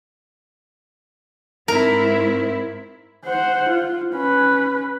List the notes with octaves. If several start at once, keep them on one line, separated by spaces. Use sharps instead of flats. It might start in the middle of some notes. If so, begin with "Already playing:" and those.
G#2 C4 E4 A#4
C5 F#5
F4
C#4 B4